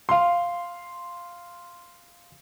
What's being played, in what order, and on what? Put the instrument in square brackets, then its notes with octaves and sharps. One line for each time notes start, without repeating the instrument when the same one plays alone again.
[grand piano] F5 C6